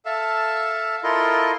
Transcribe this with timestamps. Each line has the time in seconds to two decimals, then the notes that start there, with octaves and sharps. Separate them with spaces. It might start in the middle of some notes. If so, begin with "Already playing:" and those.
0.06 A4 E5 F5 A5 E6
1.03 E4 F4 A4 A#4 D#5 C6